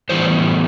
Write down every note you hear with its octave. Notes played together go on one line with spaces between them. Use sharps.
A2 E3 G3 B3 C5